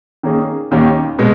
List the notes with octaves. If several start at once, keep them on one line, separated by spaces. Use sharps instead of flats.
D#3 A#3 C#4 G#4
D#2 D#3 A#3 C#4 G4
B2 G#3